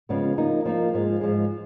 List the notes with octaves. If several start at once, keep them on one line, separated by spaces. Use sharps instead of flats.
C#3 F3 G#3 B3
F3 A#3 D#4
F3 A#3 D#4
G#2 F3 G#3
G#2 F3 G#3